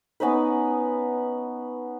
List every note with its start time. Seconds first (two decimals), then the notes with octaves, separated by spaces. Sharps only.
0.20 B3 C#4 D#4 B4